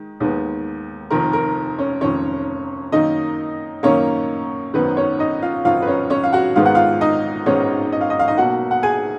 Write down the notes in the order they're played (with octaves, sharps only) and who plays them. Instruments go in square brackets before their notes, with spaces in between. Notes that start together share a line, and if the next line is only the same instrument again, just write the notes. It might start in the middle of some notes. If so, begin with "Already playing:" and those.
Already playing: [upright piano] D#3 G#3
D#2 D#3 G#3 B3
F1 F2 D#3 A#4
A#4
C#4 C#5
F1 F2 D#3 C#4 C#5
F#2 D#3 A#3 D#4 D#5
F#2 D#3 A#3 C#4 C#5
G#1 F#2 D#3 B3 B4
C#4 C#5
D#4 D#5
F4 F5
G#1 F#2 D#3 F4 F5
B4
C#4 C#5
C#4 C#5
F5
F#4 F#5
G#1 G#2 D#3 G#3 B3 F5
F#5
F4 F5
D#4 D#5
G#1 G#2 D#3 G#3 B3 C#4 C#5
D#5
F5
D#5
F5
D#4 D#5
B1 B2 A#3 F#4 F#5
F#5
G#4 G#5